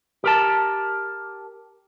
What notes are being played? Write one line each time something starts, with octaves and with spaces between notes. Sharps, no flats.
G4 A#4 A5